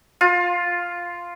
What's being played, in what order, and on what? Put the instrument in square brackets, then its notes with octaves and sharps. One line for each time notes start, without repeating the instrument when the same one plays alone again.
[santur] F4